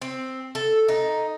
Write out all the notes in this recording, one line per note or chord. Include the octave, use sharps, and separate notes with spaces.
C4
A4
D#4